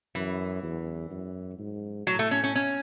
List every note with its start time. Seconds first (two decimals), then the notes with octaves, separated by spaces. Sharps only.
0.15 F#2 E3
0.63 E2
1.11 F#2
1.59 G#2
2.07 A2 F#3
2.19 A3
2.31 C#4
2.44 C#4
2.55 C#4